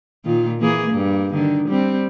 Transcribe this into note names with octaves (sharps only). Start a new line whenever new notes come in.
A#2 D#3 F4
E3 A#3 G#4
G2 A#3
D3 D#3
G3 C4